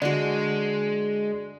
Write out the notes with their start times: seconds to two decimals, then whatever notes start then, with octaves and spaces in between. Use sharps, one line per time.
0.02 D3 G#3 F#4 D5